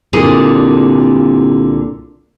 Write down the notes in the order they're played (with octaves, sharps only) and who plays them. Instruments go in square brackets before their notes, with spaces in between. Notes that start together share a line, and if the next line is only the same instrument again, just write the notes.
[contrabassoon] C2 [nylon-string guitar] A#2 D3 G#4